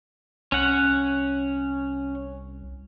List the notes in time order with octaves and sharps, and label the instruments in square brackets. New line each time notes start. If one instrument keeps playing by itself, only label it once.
[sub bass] C2 [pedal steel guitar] C#4 F#5